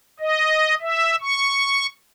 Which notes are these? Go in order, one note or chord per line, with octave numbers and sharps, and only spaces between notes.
D#5
E5
C#6